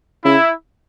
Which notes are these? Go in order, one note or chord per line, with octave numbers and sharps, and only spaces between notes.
C#3 E4